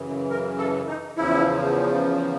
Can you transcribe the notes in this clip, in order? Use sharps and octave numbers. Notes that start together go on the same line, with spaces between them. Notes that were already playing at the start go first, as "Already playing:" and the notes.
Already playing: F#2 C#3 E3
A#4
A4
D#4
E2 C#3 F3 E4